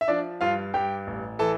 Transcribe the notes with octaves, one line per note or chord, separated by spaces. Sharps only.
E5
F3 D4 D5
G2 F4 F5
G2 G4 G5
A1
E3 A4 A5